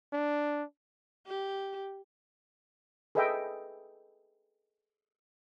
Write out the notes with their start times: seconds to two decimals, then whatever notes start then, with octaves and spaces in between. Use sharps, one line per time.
0.13 D4
1.26 G4
3.15 G#4 A4 B4 D#5 E5 G5